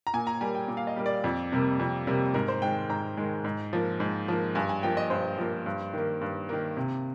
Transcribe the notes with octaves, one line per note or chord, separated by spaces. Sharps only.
A#5
A#2 G#5
A#5
G3 A#3 G#5
G5
A#2
F5
D#5
G3 A#3
D5
F2
C3 G3 A#3
F2
C3 G3 A#3
G#2 A#4
C5
D#3 G#3 G5
G#2 A#5
D#3 G#3
G#2
F3 A#3
G#2
F3 A#3
G2 G#5
G#5
F3 A#3 G5
D#5
G2 C5
F3 A#3
G2
D#3 A#3
G2
D#3 A#3
C3